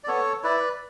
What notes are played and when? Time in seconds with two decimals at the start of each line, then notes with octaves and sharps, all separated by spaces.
0.04 D5
0.07 B3 A4 C#5
0.44 E4 B4 D5